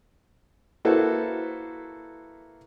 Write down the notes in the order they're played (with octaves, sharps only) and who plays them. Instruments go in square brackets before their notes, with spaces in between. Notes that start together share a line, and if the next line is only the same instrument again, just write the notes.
[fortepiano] A#3 E4 F#4 A4 B4 C5